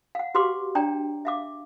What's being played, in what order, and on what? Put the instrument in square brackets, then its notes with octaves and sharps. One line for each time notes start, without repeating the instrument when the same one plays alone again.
[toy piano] F5 F#5
F#4 G4 B4 F5 C6 D6
D4 C#5 D5 G5 A#5
E5 F5 D6